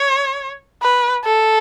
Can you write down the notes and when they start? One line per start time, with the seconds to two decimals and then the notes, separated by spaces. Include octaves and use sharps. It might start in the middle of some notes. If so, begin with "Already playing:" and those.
Already playing: C#5
0.82 B4
1.24 A4